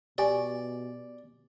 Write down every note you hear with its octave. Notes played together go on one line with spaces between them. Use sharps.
B2 G4 D5 G#5